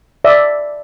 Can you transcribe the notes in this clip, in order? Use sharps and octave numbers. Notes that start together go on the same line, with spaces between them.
D5 E5